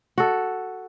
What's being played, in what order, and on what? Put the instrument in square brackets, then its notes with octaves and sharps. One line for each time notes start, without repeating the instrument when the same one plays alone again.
[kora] F#4 A4